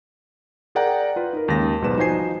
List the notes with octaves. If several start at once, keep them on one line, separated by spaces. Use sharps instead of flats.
G#4 A#4 D5 F#5 G5 A#5
F4 B4
D#4 A#4
D#2 C#3 G#3 A#6
B1 G#2 G3 B3 B4 E7
F3 D#4 F#4 C5 G#5 C7